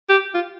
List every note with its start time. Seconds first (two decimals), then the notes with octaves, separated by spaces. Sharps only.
0.09 G4
0.34 F4